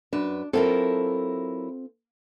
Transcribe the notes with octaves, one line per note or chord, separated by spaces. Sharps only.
F#2 D4 B4
F#3 C4 E4 F4 A4 A#4